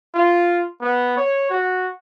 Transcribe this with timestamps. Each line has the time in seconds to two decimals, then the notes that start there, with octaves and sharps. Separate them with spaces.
0.15 F4
0.82 B3
1.17 C#5
1.50 F#4